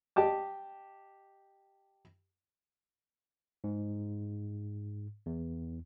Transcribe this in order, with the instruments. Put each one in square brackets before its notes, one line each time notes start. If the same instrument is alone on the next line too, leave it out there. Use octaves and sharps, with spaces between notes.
[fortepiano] G4 D#5 A5 D6
[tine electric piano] G#2
E2